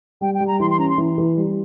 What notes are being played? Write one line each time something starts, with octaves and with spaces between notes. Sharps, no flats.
G3 G5
G5
G3
A#5
E3 C6
C6
C#4 A#5
C6
E3
E3
G3